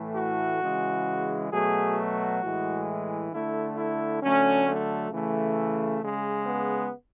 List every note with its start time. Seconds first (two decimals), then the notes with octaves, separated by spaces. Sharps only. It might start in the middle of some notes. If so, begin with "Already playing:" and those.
Already playing: A2 E3 A3
0.16 F#4
0.61 C#3 E3 G#3
1.52 B2 F#3 A3 G#4
1.97 F#4
2.42 A2 E3 G#3
3.32 D3 A3 E4
3.77 E4
4.22 D3 F#3 A3 C#4
4.68 A3
5.12 C#3 E3 A3
6.02 C#3 G#3
6.46 B3